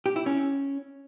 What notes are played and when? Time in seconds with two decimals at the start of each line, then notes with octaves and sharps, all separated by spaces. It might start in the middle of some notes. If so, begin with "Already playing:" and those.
0.06 G4
0.16 E4
0.26 C#4